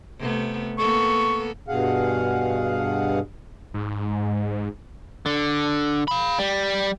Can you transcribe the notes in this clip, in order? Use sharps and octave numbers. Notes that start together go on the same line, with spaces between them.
C3 A3 B3
A#3 B3 A4 C#6
G2 B2 G#4 F5 F#5
G#2
D3
F5 B5
G3